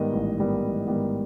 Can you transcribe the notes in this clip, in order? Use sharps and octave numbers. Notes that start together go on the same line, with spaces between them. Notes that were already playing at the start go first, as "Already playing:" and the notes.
Already playing: G#2 D#3 G3 B3 D#5
A1
G#2 D#3 G3 B3
A1
G#2 D#3 G3 B3